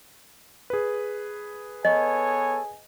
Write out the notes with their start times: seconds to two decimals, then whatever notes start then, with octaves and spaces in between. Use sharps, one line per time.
0.70 G#4 B4
1.85 B3 A4 C#5 D#5 G#5